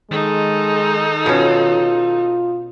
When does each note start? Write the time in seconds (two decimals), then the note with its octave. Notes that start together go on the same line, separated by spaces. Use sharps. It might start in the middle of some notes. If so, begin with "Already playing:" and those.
0.11 D#3 G#3 D#4 A4
1.26 B2 C#4 F4